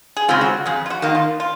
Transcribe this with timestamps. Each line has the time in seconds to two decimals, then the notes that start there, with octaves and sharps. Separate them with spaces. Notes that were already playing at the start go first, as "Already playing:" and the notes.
0.17 G#4
0.28 C#3 G#3 C4 F4
0.41 F#4
0.66 F2 G#4
0.86 F4
0.90 F#4
1.02 D#3 A#3
1.15 F4
1.40 F4